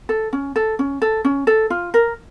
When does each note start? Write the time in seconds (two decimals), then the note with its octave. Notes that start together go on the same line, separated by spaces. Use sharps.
0.09 A4
0.33 C#4
0.56 A4
0.79 C#4
1.02 A4
1.25 C#4
1.47 A4
1.70 F4
1.94 A#4